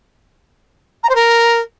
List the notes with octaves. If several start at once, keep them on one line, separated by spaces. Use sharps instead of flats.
A#5
C5
A#4